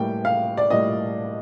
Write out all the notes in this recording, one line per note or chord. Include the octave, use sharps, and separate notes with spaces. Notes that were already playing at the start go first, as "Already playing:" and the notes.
Already playing: A2 G3 A#3 G5
F5
D5
A2 G3 A#3 D#5